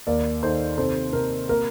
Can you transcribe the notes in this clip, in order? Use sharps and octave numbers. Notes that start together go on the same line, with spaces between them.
D#2 A#4 D5
D#3 A4 C5
C3 A4 C5
C3 A#4
A#3 A#4